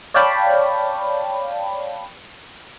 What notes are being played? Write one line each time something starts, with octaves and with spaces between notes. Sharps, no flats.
C#5 D5 F5 G5 A5 B5